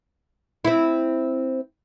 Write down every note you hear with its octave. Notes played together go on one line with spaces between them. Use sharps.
C4 E4